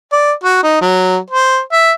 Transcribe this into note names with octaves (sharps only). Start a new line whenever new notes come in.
D5
F#4
D#4
F#3
C5
E5